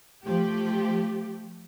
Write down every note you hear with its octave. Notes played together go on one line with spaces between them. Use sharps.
F3 A3 G4